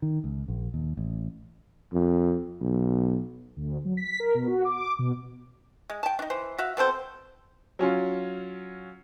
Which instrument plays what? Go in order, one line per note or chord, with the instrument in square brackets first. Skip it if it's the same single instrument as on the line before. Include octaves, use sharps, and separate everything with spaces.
[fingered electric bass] D#3
C#2
A#1
D#2
A1
[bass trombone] F2
B1
[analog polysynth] D2
F#3
B6
A#4
B2
F#4
D6
B2
[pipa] G#3
G5 A5
D4 D#4
E3 C5
F#4 E5 F5
B2 C4 A4 C5
[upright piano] F#3 C#4 F4